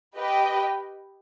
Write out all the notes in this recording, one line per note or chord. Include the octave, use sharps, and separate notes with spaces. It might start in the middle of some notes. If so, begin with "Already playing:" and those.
G4 B4 D#5 G5